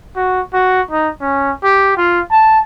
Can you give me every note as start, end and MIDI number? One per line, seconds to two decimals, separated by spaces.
0.16 0.40 66
0.53 0.81 66
0.91 1.09 63
1.21 1.51 61
1.64 1.95 67
1.97 2.20 65
2.31 2.59 81